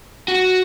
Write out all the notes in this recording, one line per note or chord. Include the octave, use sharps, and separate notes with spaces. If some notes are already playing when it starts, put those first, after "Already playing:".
F#4